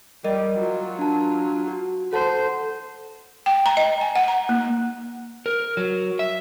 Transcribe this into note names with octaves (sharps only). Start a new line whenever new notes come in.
G3 A#4 D5 D#5
F#3 F4
D4 A5
F#4
A4 C5 F#5 A5
G5
A#5
D#5
G#5
F#5
A#5
A#3
A#4
F#3
E5